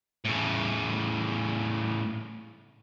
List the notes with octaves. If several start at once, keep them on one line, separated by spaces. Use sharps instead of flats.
A2 C#3